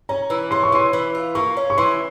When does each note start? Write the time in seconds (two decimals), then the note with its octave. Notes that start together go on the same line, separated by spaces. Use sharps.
0.09 C#4 A#5
0.30 E3
0.51 C#4 C6
0.63 C#6
0.72 E3 C6
0.93 E3
1.15 F4
1.35 A#3 C#6
1.57 C#4
1.70 C#6
1.78 E3 C6